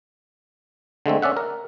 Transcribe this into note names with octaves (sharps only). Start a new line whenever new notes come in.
D3 G#3 A3 C4
C#4 D5 E5 F#5
A#4